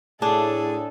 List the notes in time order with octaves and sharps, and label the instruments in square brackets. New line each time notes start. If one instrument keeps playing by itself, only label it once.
[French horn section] A2 [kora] D4 [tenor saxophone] G#4 [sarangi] A4